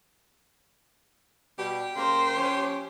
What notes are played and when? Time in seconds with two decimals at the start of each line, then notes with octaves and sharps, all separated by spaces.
1.59 B2 G3 G4
1.96 C#3 A#3 C5
2.37 F3 C#4